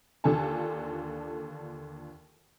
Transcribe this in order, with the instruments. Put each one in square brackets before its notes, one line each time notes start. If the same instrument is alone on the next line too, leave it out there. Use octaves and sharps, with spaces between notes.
[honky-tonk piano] D#2 D3 F4 A4 G#5 A5